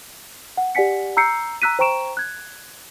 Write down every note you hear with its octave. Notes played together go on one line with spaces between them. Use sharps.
F#5
G4 D5 F#5 G#5 B6 C#7
A#5 E6 G6 C7 C#7
A#5 E6 F#6 B6 D#7
C5 G5 A#5 C#6 D7 E7
F#6 G#6